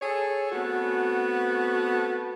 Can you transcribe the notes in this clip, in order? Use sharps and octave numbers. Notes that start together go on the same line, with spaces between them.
G#4 A4 C#5
A3 B3 C4 F#4